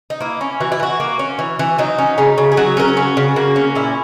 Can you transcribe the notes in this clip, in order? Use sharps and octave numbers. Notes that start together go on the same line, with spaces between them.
D#4
A#3 E4
C#4
E3 F#4
E4
E3 F#4
A#3
C#4
E3
E3
F#3 D#4
C#4
C#3 D#4
C#3
G#4
F#3 F#4
C#4 A#4
G#4
C#3 F#4
C#3
A#3 F#4
C#4
A#2 E4